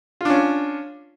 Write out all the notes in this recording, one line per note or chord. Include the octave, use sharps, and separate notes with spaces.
C#4 D4 F4